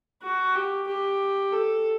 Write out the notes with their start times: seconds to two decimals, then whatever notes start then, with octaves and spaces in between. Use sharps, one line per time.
0.22 F#4
0.55 G4
0.87 G4
1.53 A4